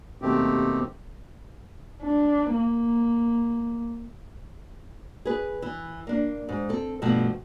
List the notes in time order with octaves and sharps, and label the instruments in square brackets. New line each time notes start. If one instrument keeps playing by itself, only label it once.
[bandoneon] D#2 B2 D#3 A3 C4 G4
[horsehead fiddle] D4
A#3
[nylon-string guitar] G#4 B4
E3
A#3 D4
G#2
C4 A4
G2 B2 F3 A3